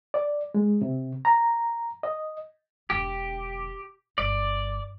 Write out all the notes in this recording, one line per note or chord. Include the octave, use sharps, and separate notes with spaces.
D5
G#3
C3
A#5
D#5
E1 D3 G4
G1 D5